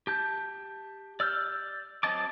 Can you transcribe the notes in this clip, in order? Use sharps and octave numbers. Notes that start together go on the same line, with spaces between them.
G4 A5 G6
D5 E6 F6 G6
F#3 C4 D#5 A5 D6